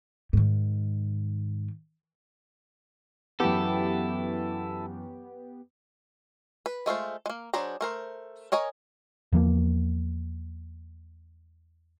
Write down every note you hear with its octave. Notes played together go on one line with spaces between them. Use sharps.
G#2 D#3
F#2 E3 B3 E4 G4 A4
B4
G#3 A3 F4 C5
G#3 A#3
F#3 D4 G#4 C5 A#5
A3 A#4 C5
A#4 C#5 D#5 G#5 A#5
E2 F3 A3 A#3